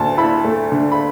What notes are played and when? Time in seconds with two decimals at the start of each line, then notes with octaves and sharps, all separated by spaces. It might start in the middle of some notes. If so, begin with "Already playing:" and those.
Already playing: D2 D3 A5
0.18 E4 B5
0.45 A3
0.72 D3
0.92 B5